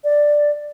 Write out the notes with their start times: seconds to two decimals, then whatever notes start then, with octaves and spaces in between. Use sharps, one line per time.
0.04 D5